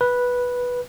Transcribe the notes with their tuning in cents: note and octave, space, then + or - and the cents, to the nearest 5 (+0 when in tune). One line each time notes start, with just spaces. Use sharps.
B4 -10